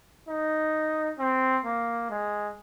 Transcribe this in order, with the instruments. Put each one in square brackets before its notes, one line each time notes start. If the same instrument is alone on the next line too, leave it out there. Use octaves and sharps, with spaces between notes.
[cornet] D#4
C4
A#3
G#3